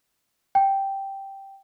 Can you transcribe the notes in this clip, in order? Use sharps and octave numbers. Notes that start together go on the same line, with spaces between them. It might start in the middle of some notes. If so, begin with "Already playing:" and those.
G5